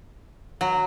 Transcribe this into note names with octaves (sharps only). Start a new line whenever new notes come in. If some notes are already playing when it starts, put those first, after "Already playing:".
F#3